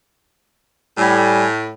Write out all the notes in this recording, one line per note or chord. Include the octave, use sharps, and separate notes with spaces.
A2 G3 G#5